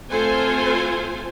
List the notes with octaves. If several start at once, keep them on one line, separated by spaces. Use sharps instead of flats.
A3 C4 F4 A4 C5 G#5